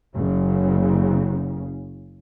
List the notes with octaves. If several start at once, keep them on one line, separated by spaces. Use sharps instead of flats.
F#1 C#3